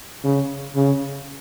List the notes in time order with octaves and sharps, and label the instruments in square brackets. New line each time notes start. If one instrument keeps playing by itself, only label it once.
[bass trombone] C#3
C#3